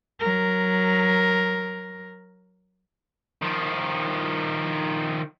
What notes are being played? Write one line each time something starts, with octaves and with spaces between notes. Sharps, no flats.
F#3 A#4
D#3 F3